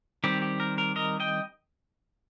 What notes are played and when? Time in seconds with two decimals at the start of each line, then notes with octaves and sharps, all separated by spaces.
0.24 D#3 G3 C4 G4
0.42 G4
0.60 A#4
0.78 A#4
0.96 A#4 D#5
1.20 D#5 G5